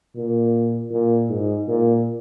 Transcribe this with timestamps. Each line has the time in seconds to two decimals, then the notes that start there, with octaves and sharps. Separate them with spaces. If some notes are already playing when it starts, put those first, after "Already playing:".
0.16 A#2
0.92 A#2
1.29 G#2
1.68 A#2